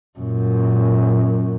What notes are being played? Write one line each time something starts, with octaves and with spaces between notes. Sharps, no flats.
F#2 A#2